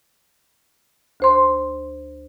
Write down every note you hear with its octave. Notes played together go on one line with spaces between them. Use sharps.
D2 C5 C6